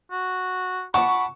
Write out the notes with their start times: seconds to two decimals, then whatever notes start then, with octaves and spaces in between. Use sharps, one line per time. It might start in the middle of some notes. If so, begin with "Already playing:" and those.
0.11 F#4
0.94 F#5 A5 B5 C#6 D6